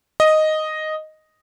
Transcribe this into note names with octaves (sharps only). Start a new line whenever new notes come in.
D#5